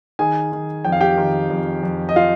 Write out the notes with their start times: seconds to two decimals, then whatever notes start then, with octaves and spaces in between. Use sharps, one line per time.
0.19 D#3 G#4 G#5
0.52 D#3
0.84 F2 G5
0.92 F5
1.01 G4 G5
1.18 D#3
1.50 F2
1.83 F2
2.09 D#5
2.16 F4 F5